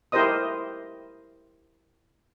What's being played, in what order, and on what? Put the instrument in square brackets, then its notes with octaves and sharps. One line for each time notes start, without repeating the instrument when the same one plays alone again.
[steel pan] E4 G4 A#4 C5 D#5 D#6